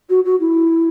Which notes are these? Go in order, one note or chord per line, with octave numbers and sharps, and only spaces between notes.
F#4
F#4
E4